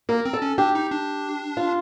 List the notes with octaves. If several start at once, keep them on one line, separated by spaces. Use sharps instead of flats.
A#3 A#4
C4
A4
C#4
D4 G4
D#4
D4
F4